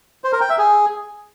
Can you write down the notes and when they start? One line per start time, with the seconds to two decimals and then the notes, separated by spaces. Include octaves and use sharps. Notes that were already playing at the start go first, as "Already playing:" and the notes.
0.24 C5
0.33 A#4
0.41 G5
0.50 E5
0.58 G#4